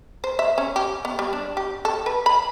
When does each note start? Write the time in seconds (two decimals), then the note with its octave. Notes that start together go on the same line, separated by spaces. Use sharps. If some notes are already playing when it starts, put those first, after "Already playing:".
0.24 C5
0.39 E5
0.58 C#4
0.76 G4
1.05 B3
1.19 G3
1.33 D4
1.57 G4
1.85 A4
2.06 B4
2.26 B5